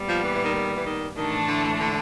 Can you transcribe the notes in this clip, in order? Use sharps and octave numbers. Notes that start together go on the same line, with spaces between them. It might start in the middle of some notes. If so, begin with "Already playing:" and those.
Already playing: A#2 G3 B3
F3
E3
E3
D#3
D#3
E3
D#3
A2 D#3 E3 A3 D4
D3
D3